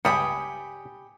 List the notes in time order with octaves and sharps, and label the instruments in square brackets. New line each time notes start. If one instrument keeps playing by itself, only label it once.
[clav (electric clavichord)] C#2 G2 G3 [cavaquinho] G4 B5 D#6 [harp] G#5 C#7